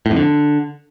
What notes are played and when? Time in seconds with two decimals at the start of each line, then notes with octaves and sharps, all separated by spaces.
0.06 A2
0.11 F2
0.16 D3